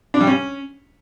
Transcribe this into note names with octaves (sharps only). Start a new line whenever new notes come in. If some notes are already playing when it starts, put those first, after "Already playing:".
D4
G3
C#4